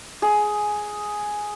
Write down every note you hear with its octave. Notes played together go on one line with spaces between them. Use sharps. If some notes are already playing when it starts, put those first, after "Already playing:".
G#4